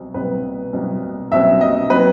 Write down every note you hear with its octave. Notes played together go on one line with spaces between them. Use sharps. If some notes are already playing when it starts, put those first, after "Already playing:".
Already playing: C2 B2 F#3 C4
C2 B2 F#3 C4 B4
C2 B2 F#3 C4
C2 B2 F#3 C4 E5
D#5
F#3 C4 D#4 B4